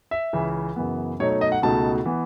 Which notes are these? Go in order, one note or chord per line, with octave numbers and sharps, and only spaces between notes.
E5
C#2 C#3 E3
F#2 C#3 E3 B3
B2 F#3 A3 D#4 C#5
C#5
D#5
F#5
C#2 B2 A3 D#4 A5
E3 B3